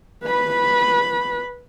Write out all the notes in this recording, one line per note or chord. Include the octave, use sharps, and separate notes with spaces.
B4 B5